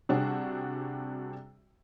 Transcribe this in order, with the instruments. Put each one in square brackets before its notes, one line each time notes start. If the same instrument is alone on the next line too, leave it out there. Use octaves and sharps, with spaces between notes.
[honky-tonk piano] C3 G3 D4 F#4 G#4